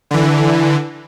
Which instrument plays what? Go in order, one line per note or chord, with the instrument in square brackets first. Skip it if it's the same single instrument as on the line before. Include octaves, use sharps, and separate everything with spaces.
[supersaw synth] D3 E3